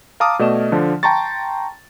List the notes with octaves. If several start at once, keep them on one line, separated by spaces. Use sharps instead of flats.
F5 A5 A#5 D6 D#6 F6
B2 A3 D5 D#5 E7
D3 F3 D4
G5 A5 A#5 C6 C#6 A6